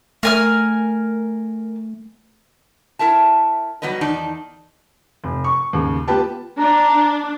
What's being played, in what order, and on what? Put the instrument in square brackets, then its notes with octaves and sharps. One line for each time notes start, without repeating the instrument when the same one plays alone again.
[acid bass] A3 [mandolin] A#4 G#5 F6
[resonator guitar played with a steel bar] E4 A#4 E5 A5
F#3 G3 B3 B4 D#5
E2 D#3 D#4 D5 A5
[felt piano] F1
C#6
D#2 C#3
B3 F4 G4 B4 G5 A5
[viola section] D4 [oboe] A#5